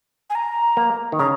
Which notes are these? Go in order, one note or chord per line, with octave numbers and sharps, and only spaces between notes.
G#5
A#5
A#3
D#3
C#3 A#5